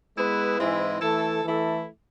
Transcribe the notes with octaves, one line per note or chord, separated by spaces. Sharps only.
G#3 B3 E4 G#4 B4
G#2 E3 G#3 C4 E4
E3 A3 E4 A4
E3 A3 E4 A4